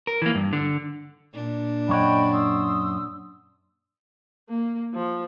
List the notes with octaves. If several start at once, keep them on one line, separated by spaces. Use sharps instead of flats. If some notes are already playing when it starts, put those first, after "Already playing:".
A#4
E3 A#3
G2
D3
A#2 D4
F#2 C#5 D#5 F#5 G5 B5
C6 D#6 E6
A#3
F3